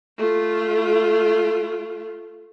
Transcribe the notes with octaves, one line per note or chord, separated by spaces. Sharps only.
A3 F4